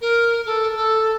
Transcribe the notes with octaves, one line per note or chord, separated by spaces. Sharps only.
A#4
A4
A4